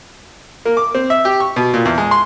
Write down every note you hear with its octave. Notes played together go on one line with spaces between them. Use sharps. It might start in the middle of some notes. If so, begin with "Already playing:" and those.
A#3
D6
C4
E5
G4
C#6
B2
A#2
E2
G#3
C6